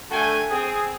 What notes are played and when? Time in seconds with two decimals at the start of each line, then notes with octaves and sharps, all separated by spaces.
0.11 D3 A3 F#4 G5 G#5
0.51 C4 G#4